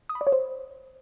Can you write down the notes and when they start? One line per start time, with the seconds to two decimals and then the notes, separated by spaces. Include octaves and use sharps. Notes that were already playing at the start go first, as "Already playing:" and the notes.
0.09 D#6
0.15 B5
0.21 D5
0.27 C#5
0.32 C5